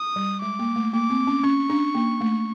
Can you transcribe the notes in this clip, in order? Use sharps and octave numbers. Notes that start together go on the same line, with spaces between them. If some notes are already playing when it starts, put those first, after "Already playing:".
Already playing: D#6
G3
G#3 D6
A#3
A3
A#3 D6
C4
C#4
C#4 C#6
D4
A#3
A3